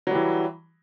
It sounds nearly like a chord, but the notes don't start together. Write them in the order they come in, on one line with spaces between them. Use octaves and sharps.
F#3 G3 E3